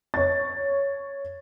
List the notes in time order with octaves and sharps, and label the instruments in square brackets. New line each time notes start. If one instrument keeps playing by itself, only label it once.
[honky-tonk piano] C#5 A6